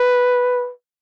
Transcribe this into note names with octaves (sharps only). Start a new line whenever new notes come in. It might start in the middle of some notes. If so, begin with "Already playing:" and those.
Already playing: B4